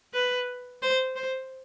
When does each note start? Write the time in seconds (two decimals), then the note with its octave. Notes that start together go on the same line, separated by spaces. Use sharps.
0.14 B4
0.82 C5
1.16 C5